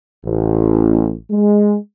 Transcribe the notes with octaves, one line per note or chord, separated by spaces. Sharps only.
A1
G#3